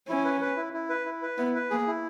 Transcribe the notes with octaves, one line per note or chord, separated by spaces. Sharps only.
C#4 E4
B4
B4
E4
E4
B4
E4
B4
B3 E4
B4
A#3 G#4
E4